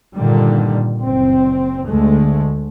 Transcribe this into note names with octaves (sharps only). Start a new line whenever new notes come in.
G2 A#2 D3 D#3 G3
F#1 C4
D2 D3 G#3 A3